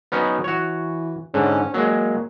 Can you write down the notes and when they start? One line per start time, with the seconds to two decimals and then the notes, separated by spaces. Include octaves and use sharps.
0.12 F#3 B3 C#4 D#4
0.44 E3 F#4 C#5
1.34 G#2 D3 C#4
1.74 F#3 G#3 A#3